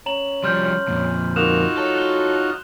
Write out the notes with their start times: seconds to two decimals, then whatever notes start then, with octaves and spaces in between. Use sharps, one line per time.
0.06 C#4 A#5 F#7
0.44 F3 G3 C6 F6 G6
0.88 F2 A#2
1.36 A#3 D#4 F4 F#4 E7 F7
1.77 F#3 A4
1.95 F#6 G7